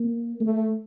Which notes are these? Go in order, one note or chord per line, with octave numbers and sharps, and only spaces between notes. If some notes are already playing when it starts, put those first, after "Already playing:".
Already playing: A#3
A3